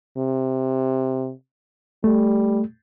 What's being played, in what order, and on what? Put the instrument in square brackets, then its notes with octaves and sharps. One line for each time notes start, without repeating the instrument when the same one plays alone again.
[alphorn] C3
[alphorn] G3 [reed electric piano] A3